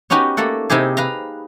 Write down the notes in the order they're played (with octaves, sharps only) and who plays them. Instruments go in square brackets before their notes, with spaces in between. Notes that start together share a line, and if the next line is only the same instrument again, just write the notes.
[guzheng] B3 C#4 D#4 F#4 G4
A3 A#3 A4 F#5
C3 D#4 E4 G4 G#4
B4 F5 A#5